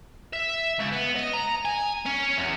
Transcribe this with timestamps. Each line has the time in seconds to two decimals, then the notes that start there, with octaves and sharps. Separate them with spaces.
0.33 E5
0.79 C#2
0.92 B3
1.16 D#5
1.33 A#5
1.65 G#5
2.06 C#4
2.38 E2